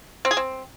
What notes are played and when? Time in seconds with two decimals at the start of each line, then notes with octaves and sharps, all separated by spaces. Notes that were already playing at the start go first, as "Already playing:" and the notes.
0.25 C4
0.31 G#4
0.37 C4